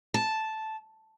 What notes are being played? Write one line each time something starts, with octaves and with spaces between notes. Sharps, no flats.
A5